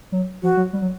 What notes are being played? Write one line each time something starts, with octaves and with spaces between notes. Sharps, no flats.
F#3
F3 F#4
F#3
G3
F#3